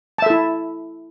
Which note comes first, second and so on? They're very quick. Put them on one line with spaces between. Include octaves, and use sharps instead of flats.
A5 E5 A4 E4